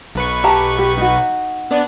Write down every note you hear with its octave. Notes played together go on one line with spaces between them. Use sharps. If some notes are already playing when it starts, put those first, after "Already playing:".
B1 B4 C#6
G4 A5 A#5
G4
D#4 F#4
B3 D4 D5